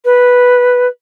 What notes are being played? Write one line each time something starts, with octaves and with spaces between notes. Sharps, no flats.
B4